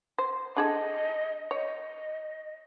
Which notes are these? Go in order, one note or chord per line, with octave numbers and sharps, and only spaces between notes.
C5
D4 G#4 A4 D#5
C#5 D#5